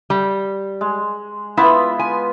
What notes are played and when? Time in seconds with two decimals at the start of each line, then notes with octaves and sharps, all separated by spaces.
0.10 G3
0.81 G#3
1.57 B3 E4 F4 B5
1.99 G#5